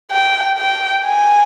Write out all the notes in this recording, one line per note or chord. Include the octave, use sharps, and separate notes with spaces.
G5
G5
G#5